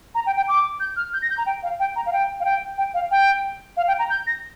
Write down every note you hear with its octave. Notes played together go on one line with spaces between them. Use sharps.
A#5
G5
G5
D6
G6
F6
G6
A#6
G6
A#5
G5
F5
G5
A#5
F5
G5
F5
G5
G5
F5
G5
F5
G5
A#5
G6
A#6